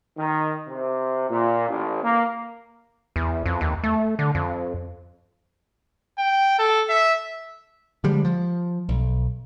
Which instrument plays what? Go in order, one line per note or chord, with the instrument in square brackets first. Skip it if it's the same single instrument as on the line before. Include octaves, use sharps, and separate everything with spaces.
[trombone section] D#3
C3
A#2
A1
A#3
[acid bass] E2
F2
D#2
A3
D3
F2
[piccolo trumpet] G5
A4
E5
[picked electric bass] D3 F3 G3 G#3
F3
B1